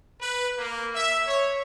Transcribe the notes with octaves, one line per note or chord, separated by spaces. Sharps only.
B4
A#3
E5
C#5